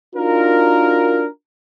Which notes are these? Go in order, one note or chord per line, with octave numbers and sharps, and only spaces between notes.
D4 D#4 F4 F#4 A#4